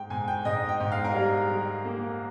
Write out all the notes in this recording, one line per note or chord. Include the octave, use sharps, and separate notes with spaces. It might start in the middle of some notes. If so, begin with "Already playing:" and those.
Already playing: G#2 G5
G#2 G#5
G5
G#2 D#5
G5
G#2
F5
A#4
G3 G#4
G3
A#3